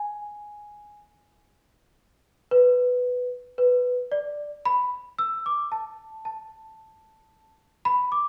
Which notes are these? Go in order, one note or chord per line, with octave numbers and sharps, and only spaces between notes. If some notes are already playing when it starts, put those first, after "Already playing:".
Already playing: G#5
B4
B4
D5
B5
E6
D6
A5
A5
B5
D6